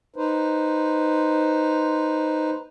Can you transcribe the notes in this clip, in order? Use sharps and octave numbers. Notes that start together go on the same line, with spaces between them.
D#4 B4 C5